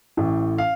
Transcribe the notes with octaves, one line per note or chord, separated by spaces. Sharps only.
A1 A2
F5